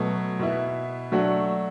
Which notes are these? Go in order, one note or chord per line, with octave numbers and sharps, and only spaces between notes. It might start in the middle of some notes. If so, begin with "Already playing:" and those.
Already playing: B2 F#3 A3
B2 B3 E4
F#3 A3 D4 F#4